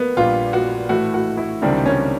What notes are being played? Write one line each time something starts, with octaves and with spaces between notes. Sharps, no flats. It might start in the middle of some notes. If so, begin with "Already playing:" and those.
Already playing: A#3 B3
A#1 A#2 G3 F4
F#4
A2 E3 A3 F#4
F#4
E4
C#2 C3 D#3 G3 C4 D4
C#4